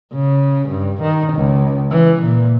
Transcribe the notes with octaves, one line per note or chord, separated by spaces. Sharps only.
C#3
G2
D#3
C#2
E3
A#2